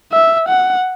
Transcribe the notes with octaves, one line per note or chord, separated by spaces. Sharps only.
E5
F#5